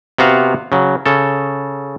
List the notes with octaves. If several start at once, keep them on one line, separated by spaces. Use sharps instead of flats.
C3 B3 F#4 F5
C#3 F#3
C#3 A4